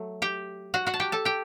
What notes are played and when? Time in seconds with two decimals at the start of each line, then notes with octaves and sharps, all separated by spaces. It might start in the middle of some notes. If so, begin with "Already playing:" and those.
Already playing: F#3 A3
0.22 G4 G5
0.74 F#4 F#5
0.87 F#4 F#5
0.94 A5
1.00 G4 G5
1.12 A4 A5
1.25 G4 G5